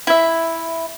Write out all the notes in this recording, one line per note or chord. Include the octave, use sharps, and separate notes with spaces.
E4 E5